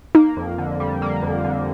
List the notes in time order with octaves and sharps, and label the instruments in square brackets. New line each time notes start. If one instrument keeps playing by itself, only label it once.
[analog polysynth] A#3 [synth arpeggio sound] D#4
[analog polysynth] F2
D3
G3
A#3
F2
D3